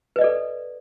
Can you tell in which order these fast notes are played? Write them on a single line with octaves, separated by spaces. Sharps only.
B4 D#5 D5 A4